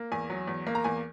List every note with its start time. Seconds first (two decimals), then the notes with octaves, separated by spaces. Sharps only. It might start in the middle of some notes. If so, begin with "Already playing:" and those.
Already playing: A#3
0.12 E2 G#5
0.30 F#3
0.47 E2
0.67 A#3
0.75 A#5
0.84 E2 G#5